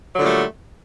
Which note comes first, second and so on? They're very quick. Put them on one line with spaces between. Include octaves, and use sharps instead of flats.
F#3 D3 A#2 G3 A3